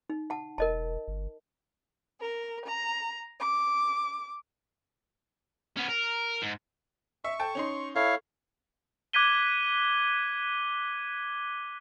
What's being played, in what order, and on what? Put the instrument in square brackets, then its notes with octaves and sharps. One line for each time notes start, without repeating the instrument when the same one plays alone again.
[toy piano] D#4
F#5 A5
[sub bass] E1 [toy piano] A#4 D#5 A5
[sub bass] G1
[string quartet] A#4
A#5
D6
[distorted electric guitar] B3 C#4
A#4
G#2
[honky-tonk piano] E5 [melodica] C#6
[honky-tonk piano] A4 G5 A5
C#4 D#4 C6
[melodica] E4 C#5 F5 [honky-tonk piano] A4
[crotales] D6 F#6 G#6 B6 D#7 G7